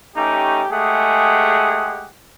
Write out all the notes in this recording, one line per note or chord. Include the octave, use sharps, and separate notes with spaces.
A3 C#4 D#4 G4
G#3 A3 G4 G#4 F#5